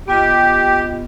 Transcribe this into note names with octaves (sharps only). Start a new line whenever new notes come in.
B3 F4 G4 D#5